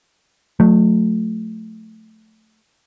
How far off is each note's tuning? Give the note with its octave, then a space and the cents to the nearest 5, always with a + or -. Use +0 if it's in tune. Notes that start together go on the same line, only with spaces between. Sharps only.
F#3 -45 A3 +0